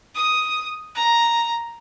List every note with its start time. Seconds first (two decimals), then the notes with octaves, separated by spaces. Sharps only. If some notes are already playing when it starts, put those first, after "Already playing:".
0.15 D#6
0.95 A#5